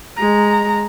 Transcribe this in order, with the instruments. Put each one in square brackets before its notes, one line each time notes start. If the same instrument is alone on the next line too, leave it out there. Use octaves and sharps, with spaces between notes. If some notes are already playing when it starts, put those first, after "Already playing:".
[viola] G#3 A#5